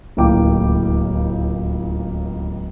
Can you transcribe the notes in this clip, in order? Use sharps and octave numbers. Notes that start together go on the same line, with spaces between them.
D1 C#2 A2 A#3 G5 D6